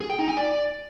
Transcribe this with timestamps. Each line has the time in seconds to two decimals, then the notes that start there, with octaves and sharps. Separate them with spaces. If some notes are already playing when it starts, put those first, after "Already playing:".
0.01 G#4
0.10 G5
0.19 D#4
0.28 G#5
0.37 D5